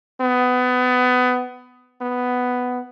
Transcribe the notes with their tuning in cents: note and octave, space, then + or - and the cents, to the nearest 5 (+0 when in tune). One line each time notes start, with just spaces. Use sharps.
B3 +25
B3 +10